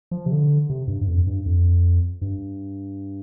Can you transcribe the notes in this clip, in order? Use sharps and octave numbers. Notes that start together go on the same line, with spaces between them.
F3
C3
D3
C3
G2
G2
F2
G2
F2
G2